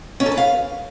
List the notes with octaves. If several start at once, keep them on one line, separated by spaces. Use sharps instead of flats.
C#4
A4
B4
F5